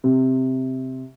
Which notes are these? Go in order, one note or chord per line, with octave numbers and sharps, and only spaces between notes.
C3